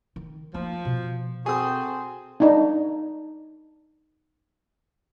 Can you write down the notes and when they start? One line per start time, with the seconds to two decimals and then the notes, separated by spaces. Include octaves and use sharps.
0.16 D#3
0.54 F3 A#3 D#4
0.85 B2
1.46 C4 F#4 G#4 A4 D#6
2.40 D4 D#4